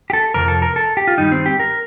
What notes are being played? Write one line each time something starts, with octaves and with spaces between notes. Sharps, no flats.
G4
A4
F2 C3 F3 A#4
A4
A#4
A4
G4
F4
G2 D#3 G3 D#4
C4
G4
A#4